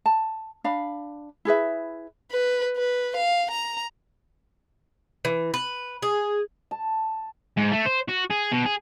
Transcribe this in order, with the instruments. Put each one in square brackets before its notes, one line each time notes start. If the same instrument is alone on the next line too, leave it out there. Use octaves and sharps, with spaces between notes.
[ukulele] A5
D4 F5 B5
E4 G#4 B4 E5
[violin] B4
B4
F5
A#5
[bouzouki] E3
B4
G#4
[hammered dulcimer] A5
[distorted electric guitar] G#2
A3
C5
F#4
G#4
B2
G#4